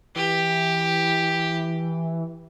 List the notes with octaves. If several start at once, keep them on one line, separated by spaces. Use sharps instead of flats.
E3 G4